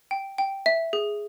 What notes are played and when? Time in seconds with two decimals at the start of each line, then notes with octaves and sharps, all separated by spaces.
0.11 G5
0.38 G5
0.66 E5
0.93 G#4